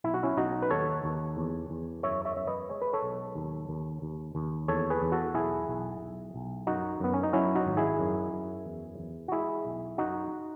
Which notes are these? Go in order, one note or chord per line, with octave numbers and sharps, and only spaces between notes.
B1 E4
F#4
C#4 E4
B1 D#4 F#4
B4
D#2 A4 C#5
D#2
E2
E2
F#2 C#5 E5
C#5 E5
F#2 E5
B4 D#5
G#3 C#5
B4
A4 C#5
B1
D#2
D#2
D#2
D#2
E2 A4 C#5
G#4 B4
E2
F#4 A4
B1 E4 G#4
B1
B1
B1
F#2 D#4 F#4
F#2 B3
C#4
D#4
F#3 C#4 E4
D#4 F#4
G#1
E4 G#4
F#2
F#2
E2
E2
F#4
G#3 E4 G#4
B1
F#2 D#4 F#4